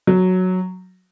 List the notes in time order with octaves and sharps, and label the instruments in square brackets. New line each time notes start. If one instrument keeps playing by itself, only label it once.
[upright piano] F#3